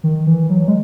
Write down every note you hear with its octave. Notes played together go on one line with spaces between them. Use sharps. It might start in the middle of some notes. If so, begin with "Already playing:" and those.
D#3
E3
F#3
G#3